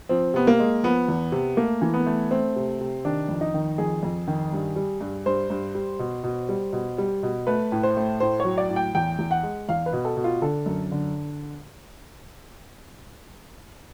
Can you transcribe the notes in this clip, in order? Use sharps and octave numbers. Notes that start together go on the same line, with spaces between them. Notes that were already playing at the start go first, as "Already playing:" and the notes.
F3 C4
C3 B3
A#3
G#3
F3 B3
E2
C3
A3 A#3
E3
B3
A3
A3 C4
C3
C3
D#3 D4
F2
D#4
D#3
F2 G#4
F2
D#3
G2
G3
G2
G2 C5
G2
G3
B2
B2
G3
B2
G3
B2
A3 B4
A2
C5
A3
A2 C5
C#5
F#3
D5
A2
G5
E2 G5
E2
F#5
G#3
E2 F5
B4
B2
A4
B2
F4
D3 A4
F#2
D3